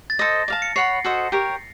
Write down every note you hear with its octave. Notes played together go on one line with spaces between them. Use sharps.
A6
A4 C5 D#5 A#6
D5 F5 A5
C#7
C#5 F#5 B5 C7
F#4 A4 C5 D#5
G4 A#4 C#5